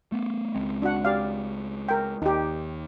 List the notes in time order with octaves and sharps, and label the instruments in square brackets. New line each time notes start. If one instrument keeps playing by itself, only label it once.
[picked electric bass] A3 B3
C#2 G#3 C4
[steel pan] D4 F#4 F#5
G4 D5 F5
A#4 G5
[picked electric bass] D#2 [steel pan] D#4 G4